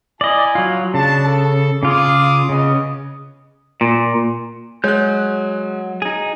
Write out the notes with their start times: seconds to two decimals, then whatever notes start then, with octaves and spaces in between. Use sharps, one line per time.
0.21 E4 D5 D#5 G#5
0.55 F#3 F4
0.94 C#3 D4 A5
1.25 A4
1.83 C#3 F4 G#4 D6
2.49 C#3 B3 C#4 D#5
3.81 A#2
4.84 F#3 G#3 C#5 F#6 G6
6.02 D#4 G#4